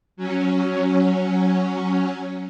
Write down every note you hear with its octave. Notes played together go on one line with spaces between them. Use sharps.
F#3 C#4